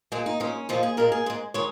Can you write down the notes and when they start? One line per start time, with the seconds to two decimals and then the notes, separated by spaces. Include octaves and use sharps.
0.12 A#2 G#3 G#4
0.26 D#4
0.40 A#2 G#3 C#4
0.69 A#2 F3 G#3 D#4
0.83 G#4
0.97 A#2 G#3 A#4
1.12 G#4
1.26 G#2 G#3
1.54 D#3 G#3 C#5